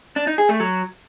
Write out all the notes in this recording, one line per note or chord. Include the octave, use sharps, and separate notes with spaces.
D4
D#4
G#4
A3
F#3